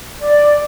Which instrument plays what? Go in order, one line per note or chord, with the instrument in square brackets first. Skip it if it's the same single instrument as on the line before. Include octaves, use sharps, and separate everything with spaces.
[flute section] D5